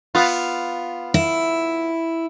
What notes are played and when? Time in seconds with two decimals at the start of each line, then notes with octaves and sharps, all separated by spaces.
0.15 B3 F4
1.14 E4